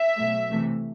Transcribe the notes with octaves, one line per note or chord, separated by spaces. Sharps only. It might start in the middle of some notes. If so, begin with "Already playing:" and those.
Already playing: E5
B2 F#3 A3
C3 E3 A3